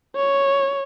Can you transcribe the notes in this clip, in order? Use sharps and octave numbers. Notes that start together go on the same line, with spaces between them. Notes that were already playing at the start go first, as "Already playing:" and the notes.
C#5